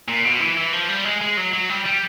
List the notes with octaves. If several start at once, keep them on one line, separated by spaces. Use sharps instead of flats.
A#2
B2
E3
E3
F3
G3
G#3
G#3
F#3
F#3
G3
G3